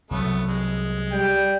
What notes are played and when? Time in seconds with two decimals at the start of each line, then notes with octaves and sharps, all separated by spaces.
0.11 C2 F#3 A3 B3
0.48 G#3
1.12 G3 G5